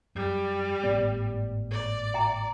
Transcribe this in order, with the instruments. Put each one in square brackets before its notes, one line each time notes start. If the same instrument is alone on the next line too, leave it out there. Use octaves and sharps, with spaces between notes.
[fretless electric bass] F#2 [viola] G3
[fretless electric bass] G#1 A2 B3 [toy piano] D5
[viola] D5
[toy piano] E5 G5 A#5